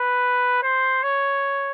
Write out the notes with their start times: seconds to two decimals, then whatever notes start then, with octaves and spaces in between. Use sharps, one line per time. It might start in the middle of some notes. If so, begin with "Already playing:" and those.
Already playing: B4
0.63 C5
1.03 C#5